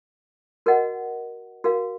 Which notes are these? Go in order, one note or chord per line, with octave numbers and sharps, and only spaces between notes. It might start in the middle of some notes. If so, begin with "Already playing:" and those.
F#4 A#4 D#5 F#5
F#4 A#4 F5